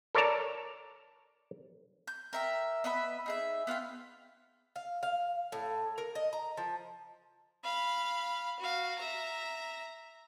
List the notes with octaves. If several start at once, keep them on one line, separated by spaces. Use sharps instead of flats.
A4 A#4 C#5 D5 A5 A#5
G6
A#4 E5 G5
B3 D#5 E5 B5
D#4 G#4 E5
B3 F4 F5 G5
F5
F5
A2
A#4
D#5
A#5
F3
F5 B5
F#4 F5
E5 A#5